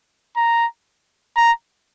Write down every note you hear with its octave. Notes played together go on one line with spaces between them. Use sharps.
A#5
A#5